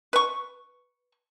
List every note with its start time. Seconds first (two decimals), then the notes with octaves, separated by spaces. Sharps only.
0.13 B4 C#6